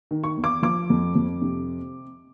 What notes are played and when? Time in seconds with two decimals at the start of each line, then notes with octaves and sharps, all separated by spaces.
0.11 D#3
0.24 C#6
0.37 E2
0.44 D6
0.63 F3 D6
0.90 F2
1.15 F2
1.42 C3